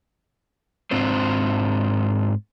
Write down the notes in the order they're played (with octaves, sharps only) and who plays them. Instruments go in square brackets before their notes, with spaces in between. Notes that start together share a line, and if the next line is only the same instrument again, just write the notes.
[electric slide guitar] G#2 C4 D4 F4 C5